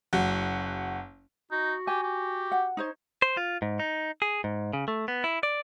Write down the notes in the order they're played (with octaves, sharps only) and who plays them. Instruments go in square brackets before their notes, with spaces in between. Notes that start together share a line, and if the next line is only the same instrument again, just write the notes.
[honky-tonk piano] F#1 F#4
[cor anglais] D#4 [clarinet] F#4
[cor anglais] G4 [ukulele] G#5
[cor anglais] G4
[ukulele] F#5
D#4 C5 C#5
[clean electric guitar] C5
F4
G#2
D#4
G#4
G#2
C#3
A3
B3
E4
D5